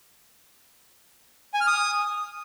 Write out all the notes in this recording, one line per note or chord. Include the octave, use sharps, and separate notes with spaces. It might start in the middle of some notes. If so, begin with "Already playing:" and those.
G#5
F6
D#6